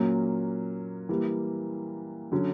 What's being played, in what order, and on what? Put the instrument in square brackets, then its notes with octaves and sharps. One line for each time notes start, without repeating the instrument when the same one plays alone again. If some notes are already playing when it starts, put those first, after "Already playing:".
Already playing: [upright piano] A#2 F#3 A#3 C#4
E3 G3 A#3
D3 F#3 C#4